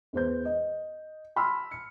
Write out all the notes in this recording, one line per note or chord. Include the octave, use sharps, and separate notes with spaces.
E2 B4 C5 G6
D#5
A5 B5 C6 E6 F6
C#7